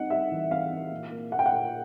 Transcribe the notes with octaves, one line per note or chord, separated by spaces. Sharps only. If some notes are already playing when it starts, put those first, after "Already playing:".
Already playing: G3 C4 D#4 F#5
G3 E5
E3
C4 F5
C4
A#2
A#3
A#3 F#5
G5
F#5
A#2